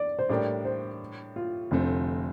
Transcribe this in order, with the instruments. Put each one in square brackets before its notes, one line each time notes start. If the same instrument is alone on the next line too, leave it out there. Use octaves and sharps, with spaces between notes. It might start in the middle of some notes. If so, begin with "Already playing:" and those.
Already playing: [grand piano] D5
C5
[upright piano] A2 G3 D4 G4 A#4 [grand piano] D5
[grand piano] C5
F4
[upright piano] F1 F2 D3 A3 C4